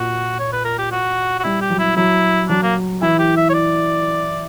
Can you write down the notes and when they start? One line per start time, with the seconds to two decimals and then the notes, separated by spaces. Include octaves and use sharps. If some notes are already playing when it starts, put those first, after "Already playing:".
Already playing: A#2 F#4
0.39 C#5
0.53 B4
0.65 A#4
0.79 G4
0.92 F#4
1.39 F#4
1.44 G3 E4
1.61 G4
1.70 F#3
1.79 E4
1.96 F#3 E4
2.49 F#3 D4
2.63 A#3
3.01 E3 E4
3.19 G4
3.37 E5
3.49 C#5
3.54 D5